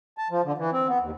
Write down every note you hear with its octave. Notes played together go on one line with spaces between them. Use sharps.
A5
F3
D3
E3
C4
B3
D#2